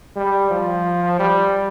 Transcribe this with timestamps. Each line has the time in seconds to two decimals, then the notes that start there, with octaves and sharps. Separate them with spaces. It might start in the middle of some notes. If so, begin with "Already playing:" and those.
0.16 G3
0.51 F3
1.19 G3